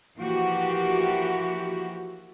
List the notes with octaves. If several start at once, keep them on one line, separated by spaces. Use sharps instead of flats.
E3 F3 A#3 F#4 G4